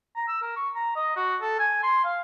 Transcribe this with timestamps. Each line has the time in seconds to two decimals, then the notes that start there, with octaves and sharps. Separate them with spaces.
0.16 A#5
0.28 E6
0.41 A#4
0.56 C#6
0.75 A#5
0.96 D#5
1.16 F#4
1.41 A4
1.59 G#5
1.83 C6
2.04 F5